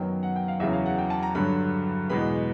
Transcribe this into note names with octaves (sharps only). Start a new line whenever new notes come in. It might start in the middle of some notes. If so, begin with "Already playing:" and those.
Already playing: F#2 D#3 F#3 B3 G5
F#5
G5
F5
E2 C#3 F#3 E5
F5
F#5
G5
A5
A#5
G2 D3 F#3 B5
E2 B2 G#3 B3 B5